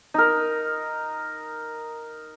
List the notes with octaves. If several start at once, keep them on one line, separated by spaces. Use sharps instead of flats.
D#4 A#4